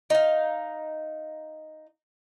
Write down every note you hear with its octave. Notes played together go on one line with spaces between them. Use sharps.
D#4 F5